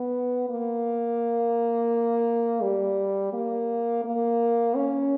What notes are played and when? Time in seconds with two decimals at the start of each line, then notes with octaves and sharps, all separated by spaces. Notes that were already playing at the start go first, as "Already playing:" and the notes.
Already playing: B3
0.49 A#3
2.62 G3
3.33 A#3
4.04 A#3
4.76 C#4